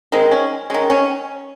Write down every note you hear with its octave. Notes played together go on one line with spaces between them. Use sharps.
D#3 G#3 C4
C#4
D#3 G#3 C#4
C#4